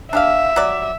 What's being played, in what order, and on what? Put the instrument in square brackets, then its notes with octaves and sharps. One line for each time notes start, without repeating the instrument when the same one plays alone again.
[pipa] D4 G4 F5 [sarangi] E5
[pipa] F#3 D5